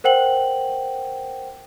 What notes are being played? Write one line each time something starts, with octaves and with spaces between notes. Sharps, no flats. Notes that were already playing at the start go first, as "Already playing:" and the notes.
A#4 C5 F#5 G5 F#7